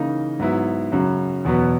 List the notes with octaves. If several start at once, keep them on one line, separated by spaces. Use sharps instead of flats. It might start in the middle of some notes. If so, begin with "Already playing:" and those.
Already playing: C#3 E3 A#3 D#4
G#2 F#3 B3 E4
F#2 C#3 F#3
E2 B2 F#3 B3